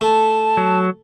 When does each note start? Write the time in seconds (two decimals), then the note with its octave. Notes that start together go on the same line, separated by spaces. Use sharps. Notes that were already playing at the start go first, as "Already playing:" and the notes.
0.01 A3 A5
0.57 F#3